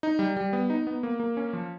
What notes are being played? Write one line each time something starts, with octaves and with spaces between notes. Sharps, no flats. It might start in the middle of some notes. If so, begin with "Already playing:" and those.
D#4
G3
G3
B3
D#4
B3
A#3
A#3
C#4
F3